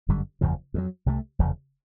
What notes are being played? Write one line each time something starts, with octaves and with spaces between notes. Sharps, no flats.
G1 F#2 D3 G3
F#1 E2 C#3 F3
F2 C#3 F#3
C2 C3 E3 A3
F1 E2 C#3